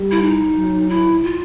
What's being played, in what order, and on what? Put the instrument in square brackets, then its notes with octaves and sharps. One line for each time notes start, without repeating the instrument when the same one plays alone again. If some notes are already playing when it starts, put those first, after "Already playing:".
Already playing: [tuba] G3
[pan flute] E4
D#4
[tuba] F#3
[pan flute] E4
F4